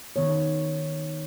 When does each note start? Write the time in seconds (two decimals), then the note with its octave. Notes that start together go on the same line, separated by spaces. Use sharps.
0.16 D#3 B3 C#5